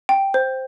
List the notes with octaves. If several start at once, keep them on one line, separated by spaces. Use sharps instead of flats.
G5
C5